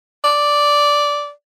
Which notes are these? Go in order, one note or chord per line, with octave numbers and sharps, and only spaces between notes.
D5